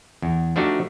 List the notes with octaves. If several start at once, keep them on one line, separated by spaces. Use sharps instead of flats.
E2
F3 A3 D4 D#4 F#4 G4